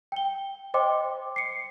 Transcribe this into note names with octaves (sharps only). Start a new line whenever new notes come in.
G5 G7
C5 D#5 G5 C6 D6
C7 C#7